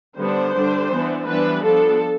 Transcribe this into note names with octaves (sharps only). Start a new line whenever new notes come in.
D3 G3 B3 D4 C5
D3 G3 D4
E3 B3 D4
E3 G3 B3 D4 B4
F3 B3 D4 A4